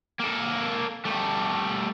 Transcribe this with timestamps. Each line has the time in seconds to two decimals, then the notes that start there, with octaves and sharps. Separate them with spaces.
0.20 A#3 A4
1.06 G3 A3